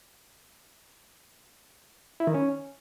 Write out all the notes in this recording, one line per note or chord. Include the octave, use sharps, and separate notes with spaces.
E4
D#3
C#4